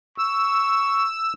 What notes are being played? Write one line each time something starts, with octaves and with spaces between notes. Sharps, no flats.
C#6 E6